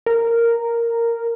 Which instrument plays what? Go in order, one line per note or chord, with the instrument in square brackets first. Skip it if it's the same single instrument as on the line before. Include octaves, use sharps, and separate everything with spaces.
[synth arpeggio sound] A#4